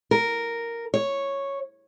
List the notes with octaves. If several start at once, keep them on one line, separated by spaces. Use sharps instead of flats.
A#4
C#5